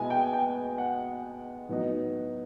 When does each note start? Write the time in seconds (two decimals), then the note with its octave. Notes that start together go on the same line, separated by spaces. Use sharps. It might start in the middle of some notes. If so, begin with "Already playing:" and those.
Already playing: B2 G#3 B3 E4 G#5
0.10 G5
0.33 G5
0.78 F#5
1.69 A2 F#3 B3 D#4